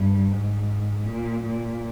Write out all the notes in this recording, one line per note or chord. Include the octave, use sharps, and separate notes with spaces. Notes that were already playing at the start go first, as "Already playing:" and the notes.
Already playing: G2
G#2
A#2
A#2